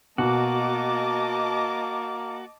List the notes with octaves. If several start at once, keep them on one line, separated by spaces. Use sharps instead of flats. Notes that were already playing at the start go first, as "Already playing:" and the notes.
B2 A#3 F#4 D#5 A5 D6